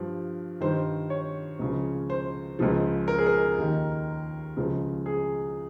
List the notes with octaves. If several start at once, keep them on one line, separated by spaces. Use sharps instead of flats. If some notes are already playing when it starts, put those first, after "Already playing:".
Already playing: G2 F3
G2 D#3 C5
C#5
C#2 C#3 F3
C5
C#2 C#3 F3
A#4
G#4
A#4
D#2 D#3
C#2 C#3 F3
G#4